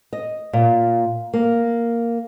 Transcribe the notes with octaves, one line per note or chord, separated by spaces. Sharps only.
D#5
A#2
A#3